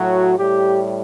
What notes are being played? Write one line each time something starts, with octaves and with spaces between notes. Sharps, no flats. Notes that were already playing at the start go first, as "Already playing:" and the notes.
Already playing: A2 F#3 F#4
A2 G3 G4